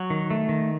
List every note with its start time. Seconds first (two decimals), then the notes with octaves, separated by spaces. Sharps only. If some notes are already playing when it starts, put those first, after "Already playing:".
Already playing: F#3
0.10 D#3
0.30 A3
0.49 D#3